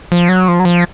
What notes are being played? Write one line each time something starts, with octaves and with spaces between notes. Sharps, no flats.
F3
F#3
F3
F#3
F3